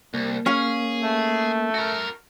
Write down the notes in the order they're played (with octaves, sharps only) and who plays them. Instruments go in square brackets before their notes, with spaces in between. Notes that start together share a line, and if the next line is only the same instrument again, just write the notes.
[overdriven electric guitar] C2 [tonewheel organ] A#3
[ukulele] C#4 F5 [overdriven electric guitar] G#4
[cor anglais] A3
[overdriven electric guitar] F#4 A#4